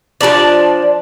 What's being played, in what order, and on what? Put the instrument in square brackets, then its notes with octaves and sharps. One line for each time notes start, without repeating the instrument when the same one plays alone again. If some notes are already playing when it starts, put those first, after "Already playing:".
[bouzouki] F3 G3 D4 D5